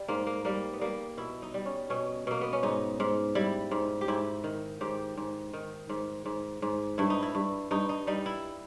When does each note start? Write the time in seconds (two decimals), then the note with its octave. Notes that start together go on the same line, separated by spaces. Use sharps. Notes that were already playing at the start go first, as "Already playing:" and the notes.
Already playing: G3
0.08 G#2 A#3
0.27 A#3
0.45 G3 A#3
0.73 B3
0.81 G3 A#3
1.17 B2 E4
1.42 D#4
1.54 G3
1.66 C#4
1.90 B2 C#4
2.27 B2 A#3
2.41 B3
2.53 C#4
2.63 G#2 D#4
3.00 G#2
3.35 G3 E4
3.71 G#2
4.01 G4
4.08 G#2 E4
4.44 D#3
4.81 G#2 G4
5.17 G#2
5.53 D#3
5.89 G#2
6.26 G#2
6.62 G#2
6.98 G2 E4
7.10 D#4
7.23 E4
7.35 G2
7.71 G2 D#4
7.89 D#4
8.07 G3 D#4
8.26 E4